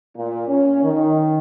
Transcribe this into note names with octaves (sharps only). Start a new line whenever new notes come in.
A#2
C#4
D#3